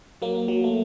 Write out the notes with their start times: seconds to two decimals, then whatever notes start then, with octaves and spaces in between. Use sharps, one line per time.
0.22 F#3 A#3
0.48 F#3
0.64 A3